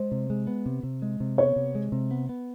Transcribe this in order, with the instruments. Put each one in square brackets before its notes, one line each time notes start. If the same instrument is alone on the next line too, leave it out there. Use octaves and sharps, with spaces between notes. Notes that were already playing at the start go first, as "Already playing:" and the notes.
Already playing: [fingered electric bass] G#3 [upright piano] C5
[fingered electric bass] C3
G#3
B3
C3
C3
G#3
C3
[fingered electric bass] B3 [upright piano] C#5
[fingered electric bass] C3
G#3
C3
B3
B3